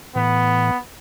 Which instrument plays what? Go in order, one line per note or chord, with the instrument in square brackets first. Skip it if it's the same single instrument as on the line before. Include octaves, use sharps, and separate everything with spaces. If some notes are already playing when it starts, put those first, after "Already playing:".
[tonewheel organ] A2 E3 [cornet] B3